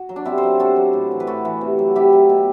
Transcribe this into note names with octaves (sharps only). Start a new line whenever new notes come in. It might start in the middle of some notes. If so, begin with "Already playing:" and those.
Already playing: F#4
F#3
D4
C3 C4 E4
A4 C5
F#3
C3 F#4 A4
F#3
A2
E3
B4
A2 F#4 A4
E3
C3
F#3
C3 E4 G4
F#3
B2